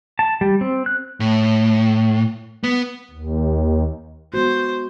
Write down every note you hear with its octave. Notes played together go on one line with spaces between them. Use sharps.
A5
G3
C4
F#6
A2
B3
D#2
G#3 B3 F#4 C5